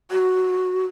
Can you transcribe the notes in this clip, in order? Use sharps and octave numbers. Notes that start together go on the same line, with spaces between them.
F#4